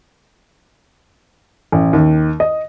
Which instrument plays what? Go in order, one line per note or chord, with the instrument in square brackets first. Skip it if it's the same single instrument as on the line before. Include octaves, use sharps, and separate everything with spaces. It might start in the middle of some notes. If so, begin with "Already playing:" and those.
[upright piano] A1
D#2
D#5